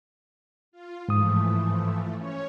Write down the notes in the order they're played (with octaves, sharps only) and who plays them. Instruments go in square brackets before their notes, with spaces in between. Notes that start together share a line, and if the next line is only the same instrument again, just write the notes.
[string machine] F4
[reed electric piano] G#2 D#6 [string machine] E3 F3 A3
[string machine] C#4 C#5